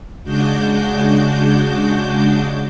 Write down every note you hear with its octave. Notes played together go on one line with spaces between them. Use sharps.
C#3 G#3 D4 F#4 D6 G6